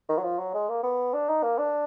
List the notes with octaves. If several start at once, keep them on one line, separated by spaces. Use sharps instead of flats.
D#3
F#3
F3
F#3
G#3
A#3
B3
D4
D#4
A#3
D4